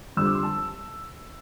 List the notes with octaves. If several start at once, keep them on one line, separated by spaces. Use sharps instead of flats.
F2 D3 G3 E6
D6
C6
A5